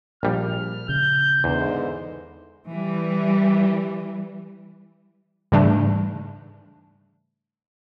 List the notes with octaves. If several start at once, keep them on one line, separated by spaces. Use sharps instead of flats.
A#1 G3 F6
C#3 G6
E2 G#2 D3 E3 C5
E3 G3
G#2 C#3 E3 G3 A3 D4